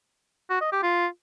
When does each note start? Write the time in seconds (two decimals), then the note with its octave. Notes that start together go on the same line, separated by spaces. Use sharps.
0.50 F#4
0.61 D#5
0.72 G4
0.83 F4